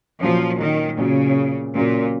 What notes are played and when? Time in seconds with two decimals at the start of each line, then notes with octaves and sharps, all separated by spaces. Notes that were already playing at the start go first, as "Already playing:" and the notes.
0.21 A#2 F3 F#3 C#4
0.59 D#3
0.98 A#2 C#3 F#3 C#4
1.75 A#2 C#3 F#3 C#4